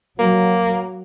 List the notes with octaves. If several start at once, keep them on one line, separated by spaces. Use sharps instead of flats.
F#3 A#3